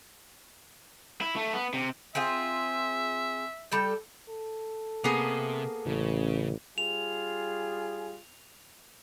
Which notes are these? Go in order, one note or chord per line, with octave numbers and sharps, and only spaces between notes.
E4
A3
B3
C3
C4 F4 G#4 E5
G3 A4 G5
A4
C3 A#3 B3 G#4
A1 C#3
G3 F4 G#4 F7